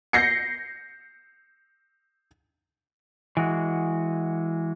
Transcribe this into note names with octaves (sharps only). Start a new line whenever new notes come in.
G6 A#6 C7 C#7
E3 G#3 F#4